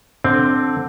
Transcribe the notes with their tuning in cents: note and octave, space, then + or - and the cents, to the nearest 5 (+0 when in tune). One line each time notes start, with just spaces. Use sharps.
D3 +0 C4 +0